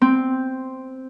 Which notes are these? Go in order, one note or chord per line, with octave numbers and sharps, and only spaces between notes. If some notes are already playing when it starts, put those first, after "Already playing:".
C4